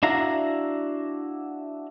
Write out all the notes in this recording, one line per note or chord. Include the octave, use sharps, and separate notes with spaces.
D4 E4 F#4 F5 A#5